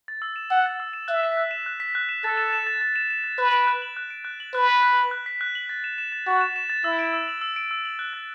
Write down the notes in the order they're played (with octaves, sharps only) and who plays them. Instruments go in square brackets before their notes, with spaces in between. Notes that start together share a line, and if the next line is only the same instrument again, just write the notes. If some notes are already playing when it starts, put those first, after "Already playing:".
[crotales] A6
E6
E7
[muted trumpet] F#5 [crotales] E6
[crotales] A6
E6
E7
[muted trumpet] E5 [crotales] F#6
[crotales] B6
F#6
E7
F#6
B6
F#6
E7
[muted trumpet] A4 [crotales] A6
[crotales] E7
E7
A6
A6
E7
E7
A6
[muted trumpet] B4 [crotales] F#6
[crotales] D7
F#6
F#7
F#6
D7
F#6
F#7
[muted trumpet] B4 [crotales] F#6
[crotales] B6
F#6
F#7
F#6
B6
F#6
F#7
A6
E7
E7
A6
[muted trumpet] F#4 [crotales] A6
[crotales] E7
E7
A6
[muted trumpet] E4 [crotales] E6
[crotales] D7
E6
F#7
E6
D7
E6
F#7
F#6
A6